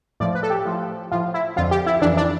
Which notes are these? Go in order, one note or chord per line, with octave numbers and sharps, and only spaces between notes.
A2 F3 D5
B4
A4
G4
A2 F3
A2 F3 F4
E4
F2 D3 F3 F4
G4
E4
F2 E3 D4
D4